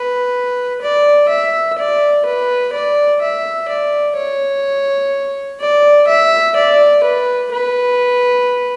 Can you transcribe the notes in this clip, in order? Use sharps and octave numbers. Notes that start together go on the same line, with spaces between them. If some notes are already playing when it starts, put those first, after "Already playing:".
Already playing: B4
D5
E5
D5
B4
D5
E5
D5
C#5
D5
E5
D5
B4
B4